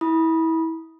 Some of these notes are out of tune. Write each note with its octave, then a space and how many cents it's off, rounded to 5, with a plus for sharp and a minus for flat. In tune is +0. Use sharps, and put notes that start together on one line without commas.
E4 -25 B5 -25 D#6 +0